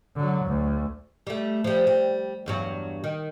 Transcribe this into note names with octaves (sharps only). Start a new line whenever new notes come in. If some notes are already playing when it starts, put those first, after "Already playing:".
D3 F#3
D2
G3 A3
F3 G3
G3
E2 G2 F#3
D#3